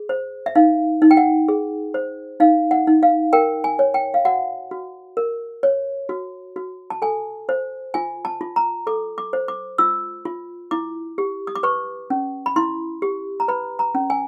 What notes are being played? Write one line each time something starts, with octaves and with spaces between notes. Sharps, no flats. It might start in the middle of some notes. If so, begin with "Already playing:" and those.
Already playing: G#4
C5
E5
D#4 F5
D#4
G5
F#5
G#4
C5
D#4 F5
F#5
D#4
F5
A#4 G5
G#5
C#5
G5
F5
F#4 F#5
F#4
A#4
C#5
F#4
F#4
A5
A4 G#5
C5
F4 G#5
A5
F4
A#5
A4 D6
D6
C5
D6
F4 E6
F4
E4 D6
G4
D#6
D6
B4 C#6
C#4
B5
E4 C6
G4
A#5
B4 B5
A#5
C#4
G#5